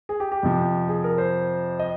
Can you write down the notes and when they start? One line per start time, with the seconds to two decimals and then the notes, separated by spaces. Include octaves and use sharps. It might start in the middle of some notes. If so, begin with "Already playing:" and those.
0.09 G#4
0.20 G4
0.32 G4
0.43 F2 C3 F3
0.89 G#4
1.04 A#4
1.18 C5
1.80 D#5